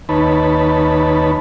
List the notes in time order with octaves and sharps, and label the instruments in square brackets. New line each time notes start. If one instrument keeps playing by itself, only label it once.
[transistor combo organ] D#2 D#4 B4 C#5 A5 B5